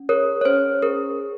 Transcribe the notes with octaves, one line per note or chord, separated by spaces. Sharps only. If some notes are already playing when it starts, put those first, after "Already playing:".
Already playing: C#4
G#4 A#4 C#5
C#5
C#4 C5
G#4 A#4